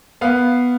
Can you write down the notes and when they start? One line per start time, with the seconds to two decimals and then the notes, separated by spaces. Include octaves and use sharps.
0.21 B3 F5